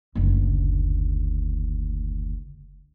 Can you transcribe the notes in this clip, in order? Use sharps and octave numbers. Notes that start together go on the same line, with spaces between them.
F#1 D2